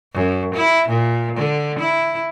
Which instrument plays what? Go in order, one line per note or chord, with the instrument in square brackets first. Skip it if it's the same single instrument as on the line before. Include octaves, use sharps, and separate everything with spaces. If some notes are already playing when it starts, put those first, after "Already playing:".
[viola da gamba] F#2
E4
A#2
D3
E4